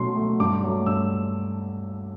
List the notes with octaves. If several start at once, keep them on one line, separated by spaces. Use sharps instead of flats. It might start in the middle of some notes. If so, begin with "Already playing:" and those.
Already playing: B2 F#3 A3 C6
F#3 A3
G2 D6
F#3 A3
G2 E6